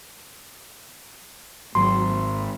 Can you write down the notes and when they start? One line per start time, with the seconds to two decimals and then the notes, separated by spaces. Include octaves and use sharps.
1.75 G#1 F#3 C6
2.08 A3